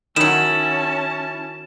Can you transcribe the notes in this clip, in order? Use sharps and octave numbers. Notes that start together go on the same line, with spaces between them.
D#3 F#3 C#4 E4 A5 E7